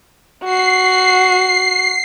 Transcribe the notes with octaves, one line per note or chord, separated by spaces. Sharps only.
F#4 C7